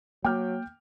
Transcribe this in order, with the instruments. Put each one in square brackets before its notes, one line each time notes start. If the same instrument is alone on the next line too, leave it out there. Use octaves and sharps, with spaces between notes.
[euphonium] F#3 [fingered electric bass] A#3 [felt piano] G5 D6 F6